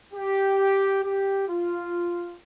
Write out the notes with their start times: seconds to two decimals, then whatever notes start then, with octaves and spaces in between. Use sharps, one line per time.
0.14 G4
1.04 G4
1.49 F4